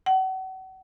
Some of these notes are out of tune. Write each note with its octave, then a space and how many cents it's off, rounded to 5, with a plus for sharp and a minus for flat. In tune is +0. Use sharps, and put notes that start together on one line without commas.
F#5 +35